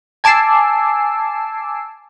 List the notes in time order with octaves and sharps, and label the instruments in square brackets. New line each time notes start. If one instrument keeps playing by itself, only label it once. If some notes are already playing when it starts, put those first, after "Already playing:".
[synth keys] G#5 A5 D6 E6 C7